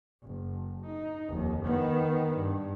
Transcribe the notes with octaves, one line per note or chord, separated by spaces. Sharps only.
F#1
D#4
F1 D#2
D#3 B3
G2